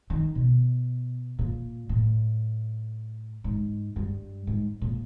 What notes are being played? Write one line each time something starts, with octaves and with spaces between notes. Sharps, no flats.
D#3
B2
A#2
A2
G#2
G2
G#2
A#2